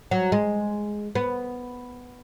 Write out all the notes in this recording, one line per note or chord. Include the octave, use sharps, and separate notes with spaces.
F#3
G#3
B3